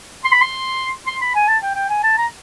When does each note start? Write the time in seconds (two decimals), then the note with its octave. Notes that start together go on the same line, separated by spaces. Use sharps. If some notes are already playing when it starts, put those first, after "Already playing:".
0.24 C6
0.32 B5
0.41 C6
1.07 C6
1.21 B5
1.35 G#5
1.48 A5
1.62 G5
1.75 G5
1.89 G#5
2.03 A5
2.17 A#5